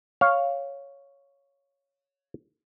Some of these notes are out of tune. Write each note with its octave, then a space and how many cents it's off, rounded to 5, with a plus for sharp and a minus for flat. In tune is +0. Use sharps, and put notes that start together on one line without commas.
C#5 +0 F5 +0